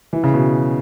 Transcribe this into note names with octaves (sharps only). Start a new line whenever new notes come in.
E3
C#3
B2